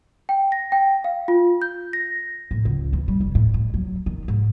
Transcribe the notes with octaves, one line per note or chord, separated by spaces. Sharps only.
G5
A#6
G5
F5
F4
G6
A#6
A2
C#2
E3
G3
F1
A2
A2
F#3
D#3
G#2